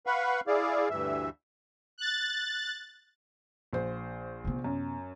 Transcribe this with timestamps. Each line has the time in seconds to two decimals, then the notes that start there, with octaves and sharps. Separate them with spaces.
0.06 B4 F5 F#5 B5 C#6
0.47 E4 G#4 D5 F5
0.90 D2 G2 E3 E5
1.98 F#6 A6
3.73 A#1 C5
4.45 C3 B3
4.64 F#2